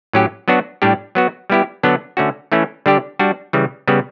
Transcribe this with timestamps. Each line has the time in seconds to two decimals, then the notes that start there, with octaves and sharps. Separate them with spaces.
0.13 A2 F#3 C#4 G4
0.48 F#3 B3 D4 F#4
0.82 A2 G3 D4 G4
1.15 F#3 B3 F#4
1.50 G3 B3 E4 G4
1.83 D3 F#3 B3 D4
2.17 D3 A3 C#4 F#4
2.52 E3 A3 C#4 E4
2.86 D3 G3 D4 G4
3.19 G3 D4 F#4
3.53 C#3 E3 G3
3.88 C#3 G3 B3